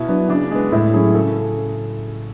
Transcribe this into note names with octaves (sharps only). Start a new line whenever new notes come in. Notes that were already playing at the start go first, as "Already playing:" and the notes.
Already playing: B2 E4
F#3 B3 D4
C#3 D4
G#3 B3
A2 E4
F#3 C#4 G#4
C#3 A4